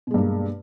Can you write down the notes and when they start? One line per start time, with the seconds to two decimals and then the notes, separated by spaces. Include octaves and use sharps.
0.07 B2
0.11 G#3
0.14 G2
0.18 A#3